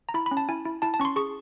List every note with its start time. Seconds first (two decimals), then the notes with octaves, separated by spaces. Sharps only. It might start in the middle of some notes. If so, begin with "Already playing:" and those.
0.09 A#5
0.14 E4 B5
0.26 B5
0.31 C#4
0.37 A5
0.48 E4 G#5
0.65 E4
0.82 E4 A5
0.94 A5
1.00 C#4 C#6
1.05 C6
1.16 G#4 C#6